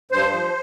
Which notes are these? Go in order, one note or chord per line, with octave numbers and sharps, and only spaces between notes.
G2 C5
F3